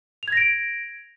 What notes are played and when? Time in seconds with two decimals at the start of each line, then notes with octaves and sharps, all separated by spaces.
0.23 F7
0.28 G#6
0.32 A#6
0.37 D7